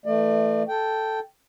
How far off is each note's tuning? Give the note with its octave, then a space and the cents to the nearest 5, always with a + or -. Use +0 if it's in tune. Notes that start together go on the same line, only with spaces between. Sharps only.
E3 +5 A3 +15 D5 +40
A4 +0 G5 -5